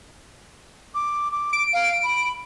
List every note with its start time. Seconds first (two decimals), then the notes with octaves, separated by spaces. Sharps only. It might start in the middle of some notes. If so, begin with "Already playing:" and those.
0.95 D6
1.32 D6
1.53 D7
1.73 F5
2.03 B5